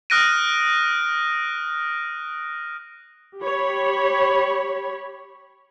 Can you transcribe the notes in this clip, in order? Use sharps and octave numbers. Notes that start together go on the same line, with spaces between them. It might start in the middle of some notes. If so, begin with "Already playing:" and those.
D#6 F6 F#6 A#6 D7 D#7
G4 C#5 B5